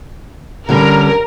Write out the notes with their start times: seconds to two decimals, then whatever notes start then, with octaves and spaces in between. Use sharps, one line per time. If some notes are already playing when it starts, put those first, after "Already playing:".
0.69 D3 G3 C#4 A#4